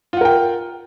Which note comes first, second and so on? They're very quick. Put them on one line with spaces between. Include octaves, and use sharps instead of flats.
F4 F#5 A#4 G5